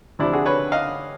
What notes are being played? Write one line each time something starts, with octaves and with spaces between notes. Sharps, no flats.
D2 C3 F3 D4 E4
F#4 G#4
B4 C#5
D#5 F5